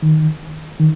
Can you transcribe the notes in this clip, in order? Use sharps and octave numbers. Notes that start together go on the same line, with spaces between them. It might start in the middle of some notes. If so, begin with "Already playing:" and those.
D#3
D#3